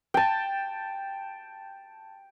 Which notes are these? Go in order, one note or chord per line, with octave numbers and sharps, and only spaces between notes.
G5 A5